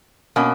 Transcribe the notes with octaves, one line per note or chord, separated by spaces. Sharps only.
B2 A#3 C#4